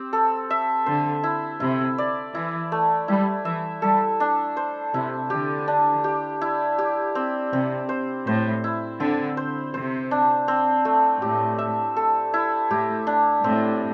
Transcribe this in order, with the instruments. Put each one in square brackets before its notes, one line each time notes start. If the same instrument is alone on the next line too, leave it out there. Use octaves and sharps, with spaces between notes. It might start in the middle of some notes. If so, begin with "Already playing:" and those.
Already playing: [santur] C4 G4
A4
E5
[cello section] D3 [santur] C5
[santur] E4
[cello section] C3 [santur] E4
[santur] D5
[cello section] E3 [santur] E4
[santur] A3
[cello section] G3 [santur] E4
[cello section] E3 [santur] E5
[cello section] G3 [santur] A4
[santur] D4
C5
[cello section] C3 [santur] E4
[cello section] D3 [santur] G4
[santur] D4
G4
E4
G4
C4
[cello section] C3 [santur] C4
[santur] C5
[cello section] A2 [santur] C5
[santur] E4
[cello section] D3 [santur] C4
[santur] C5
[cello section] C3 [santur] C5
[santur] D4
C4
A3
[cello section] A2 [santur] G4
[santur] E5
A4
E4
[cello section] A2 [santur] G4
[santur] D4
[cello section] A2 [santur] C4